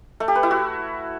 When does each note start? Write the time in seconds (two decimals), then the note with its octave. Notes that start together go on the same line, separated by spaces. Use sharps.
0.20 A3
0.28 G4
0.35 B4
0.43 E4
0.51 F#4